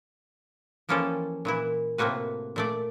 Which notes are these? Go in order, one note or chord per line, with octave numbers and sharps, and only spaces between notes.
E3 F3 A#3 C#4 G4 A4
A#2 E3 E4
A2 C3 A3 A#3 F#4 B4
A#2 A3 D5